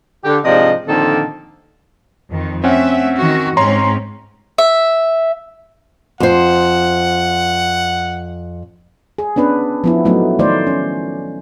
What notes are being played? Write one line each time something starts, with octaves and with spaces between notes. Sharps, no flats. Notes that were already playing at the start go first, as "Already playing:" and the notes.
D3 G4
G#2 C3 F3 D4 D5 D#5
A#2 D3 D#3 F3 C4 A4
F2 D#3
A3 C4 C#4 E5 F#5
D#3 F#4
G#2 C4 C#4 C#5 A#5 C6
E5
F2 C5 F#5
G#4
B3 C#4 D4 B4
F3 B3 E4
F#3 A3 B3 D#4
D#3 A3 D#4 C5 D5
C#4